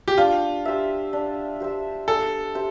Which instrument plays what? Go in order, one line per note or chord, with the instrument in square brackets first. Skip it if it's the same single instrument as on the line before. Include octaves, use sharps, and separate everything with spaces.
[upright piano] G4
[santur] D4 [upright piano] F4
[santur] G4 C5 E5
D4
G4 C5 E5
[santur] D4 [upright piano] A4
[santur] G4 C5 E5